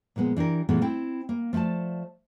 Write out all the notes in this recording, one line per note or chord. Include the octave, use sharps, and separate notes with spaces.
A#2 F3 G#3 B3
E3 D4 G4 A#4
A#2 E3 G#3 A3 B3 C4
C4 E4 G5
A#3
F3 A3 C5 D5 A5